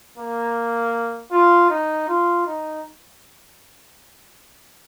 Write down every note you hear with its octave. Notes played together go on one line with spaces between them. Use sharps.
A#3
F4
D#4
F4
D#4